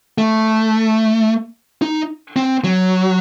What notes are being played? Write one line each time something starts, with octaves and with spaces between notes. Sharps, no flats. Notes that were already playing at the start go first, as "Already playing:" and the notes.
A3
D#4
C4
F#3